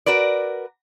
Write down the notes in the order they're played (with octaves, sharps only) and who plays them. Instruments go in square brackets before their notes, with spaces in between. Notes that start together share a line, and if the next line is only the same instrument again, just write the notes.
[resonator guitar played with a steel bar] F#4 A#4 B4 D5